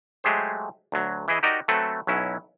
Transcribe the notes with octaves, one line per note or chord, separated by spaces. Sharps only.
F#3 G#3 A3 G4 G#4 C5
D2 F#3
E3 E4 G#4 D#5
D#4 F#4 G4 A#4 D5 D#5
F#3 A3 C4 A4 B4
B1 F#3 C#4 E4